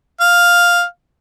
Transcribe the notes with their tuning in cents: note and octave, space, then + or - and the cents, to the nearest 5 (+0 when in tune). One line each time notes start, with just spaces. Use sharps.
F5 +5